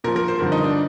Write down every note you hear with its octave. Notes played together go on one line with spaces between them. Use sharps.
A#2 F3 A#4
A#4
C5
G2 D3 F3 A#4
D#4
D4